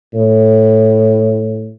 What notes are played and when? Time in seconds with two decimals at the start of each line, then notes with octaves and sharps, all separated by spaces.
0.13 A2